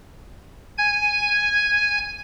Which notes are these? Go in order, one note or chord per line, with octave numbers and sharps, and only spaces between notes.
G#5 G#6